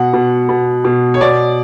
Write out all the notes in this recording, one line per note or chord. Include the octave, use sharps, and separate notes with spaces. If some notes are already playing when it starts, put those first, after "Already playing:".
Already playing: B2 F#5
B2
B2
B2
C#5
B2 D5